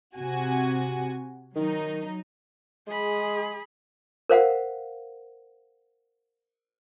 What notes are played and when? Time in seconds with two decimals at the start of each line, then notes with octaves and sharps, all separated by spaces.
0.16 C3 F#4 G#5
1.56 D#3 F#3 D#4
2.88 G#3 G#4 B5
4.29 A#4 C5 F5 F#5